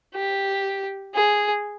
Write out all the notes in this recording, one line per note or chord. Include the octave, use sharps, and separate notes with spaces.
G4
G#4